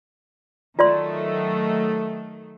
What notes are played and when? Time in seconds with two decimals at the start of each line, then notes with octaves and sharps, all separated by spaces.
0.79 D#3 F#3 A3 F4 D5 C6